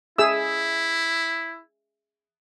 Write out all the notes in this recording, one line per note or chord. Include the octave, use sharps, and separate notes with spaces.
E4 G#4 E5 E6